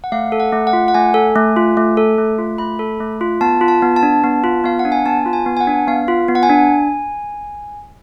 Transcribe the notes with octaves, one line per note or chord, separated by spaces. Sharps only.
F#5
A3 F5
A4
F#5
A3
F#5
F4
F#5
A3 G#5
A4
A3
F4
A3
A4
A3
F4
A3 B5
A4
A3
F4
B3 A5
F4
A5
B3
A5
D4
B3
F4
B3 F5
F#5
D4
G#5
B3 A5
F4
G#5
B3
G#5
F#5
D4
B3 F5
F4
B3
F#5
G#5
D4